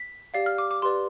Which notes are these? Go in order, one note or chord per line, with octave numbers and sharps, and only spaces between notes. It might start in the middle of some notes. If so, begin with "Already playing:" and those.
Already playing: B6
G4 D5 F5 C7
F6
D6
D6
G4 B4 D5 C6